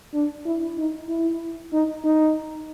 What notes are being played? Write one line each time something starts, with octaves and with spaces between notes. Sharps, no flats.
D4
E4
D#4
E4
D#4
D#4